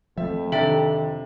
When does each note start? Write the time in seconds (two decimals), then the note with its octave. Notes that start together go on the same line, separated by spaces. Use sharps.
0.17 F2 F3 A3 E5
0.52 C3 D#3 D4 A4 E5 G5 A6